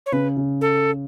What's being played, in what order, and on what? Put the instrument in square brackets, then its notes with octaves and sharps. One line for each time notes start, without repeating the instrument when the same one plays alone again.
[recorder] C#5
[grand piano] C#3 [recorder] B4
[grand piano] C#3
[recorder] A4